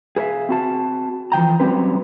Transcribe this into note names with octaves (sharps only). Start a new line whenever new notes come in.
G#4 B4 C#5 E5 F5
C4 F#4 A5
E3 F3 G5 A#5
F#3 G3 C4 C#4 B4